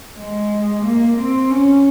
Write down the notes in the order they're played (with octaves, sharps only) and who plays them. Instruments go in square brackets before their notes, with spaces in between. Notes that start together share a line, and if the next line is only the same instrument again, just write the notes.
[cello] G#3
A#3
C4
C#4